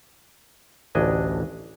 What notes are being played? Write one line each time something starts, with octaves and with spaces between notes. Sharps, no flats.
A1 D2 D4 D#5 G#5